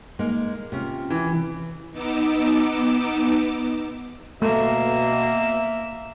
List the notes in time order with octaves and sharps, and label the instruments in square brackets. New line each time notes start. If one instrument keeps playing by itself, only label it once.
[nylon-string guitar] G#3 A#3 D#4
C3 C#4 F4
[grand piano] E3
[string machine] B3 D#4 D6 E6
[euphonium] B2 [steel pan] A3 [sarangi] A#3 [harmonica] E5